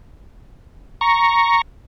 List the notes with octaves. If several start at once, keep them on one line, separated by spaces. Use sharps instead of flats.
A#5 C#6